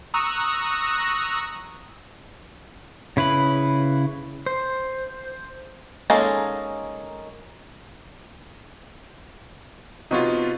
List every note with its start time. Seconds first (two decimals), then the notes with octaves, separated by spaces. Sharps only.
0.14 A#5 C#6 D#6 E6 F#6 A#6
3.17 C#3 E4 B4 B5
4.46 C5
6.10 G#3 A#3 C#4 D#4 A4
10.11 C3 B3 D#4 F4 F#4 C#5